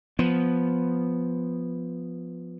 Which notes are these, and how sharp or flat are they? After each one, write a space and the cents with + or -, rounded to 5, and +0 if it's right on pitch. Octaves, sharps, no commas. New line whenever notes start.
F3 +0 B3 +0